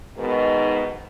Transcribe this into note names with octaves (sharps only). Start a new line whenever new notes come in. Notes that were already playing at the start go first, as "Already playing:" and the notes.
G#2 B2 D#3